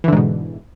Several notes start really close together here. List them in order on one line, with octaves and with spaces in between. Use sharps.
E3 D3 G#2 B2